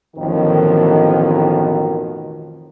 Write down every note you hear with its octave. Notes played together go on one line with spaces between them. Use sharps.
A1 F2 B2 D#3